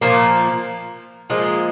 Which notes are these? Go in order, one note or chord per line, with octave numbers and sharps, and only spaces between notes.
A#2 F3 A#3
A#2 F3 G#3